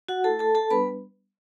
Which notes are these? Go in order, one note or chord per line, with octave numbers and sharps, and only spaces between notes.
F#4 F#5
A3 E4 A4 A5
A4 A5
A4 A5
G3 B3 D4 B4 B5